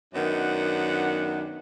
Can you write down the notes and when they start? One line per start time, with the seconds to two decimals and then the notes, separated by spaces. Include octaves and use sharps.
0.14 F#2 D#3 B3 D4 F#5